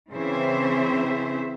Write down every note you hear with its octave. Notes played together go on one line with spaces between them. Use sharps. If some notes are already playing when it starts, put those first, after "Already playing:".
C#3 E3 C4 C5 E5